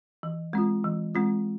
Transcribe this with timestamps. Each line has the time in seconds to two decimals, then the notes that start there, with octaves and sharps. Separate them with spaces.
0.23 E3
0.53 G#3 C4 F4
0.84 E3
1.15 G#3 C4 F4